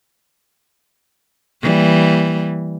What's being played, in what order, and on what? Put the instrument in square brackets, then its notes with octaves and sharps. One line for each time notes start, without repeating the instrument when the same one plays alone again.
[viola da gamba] E3 G3 A#3